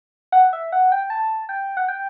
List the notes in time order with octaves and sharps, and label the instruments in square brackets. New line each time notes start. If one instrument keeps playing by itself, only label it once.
[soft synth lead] F#5
E5
F#5
G5
A5
G5
F#5
G5